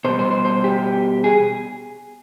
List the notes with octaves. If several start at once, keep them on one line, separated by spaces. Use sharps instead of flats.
B2 G3 C5
C5
C5
C5
G4
G#4